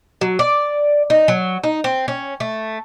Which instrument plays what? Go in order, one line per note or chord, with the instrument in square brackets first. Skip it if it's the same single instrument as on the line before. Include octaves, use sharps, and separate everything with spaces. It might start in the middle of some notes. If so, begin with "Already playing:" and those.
[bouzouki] F#3
D5
D#4
F#3
D#4
C4
C#4
A3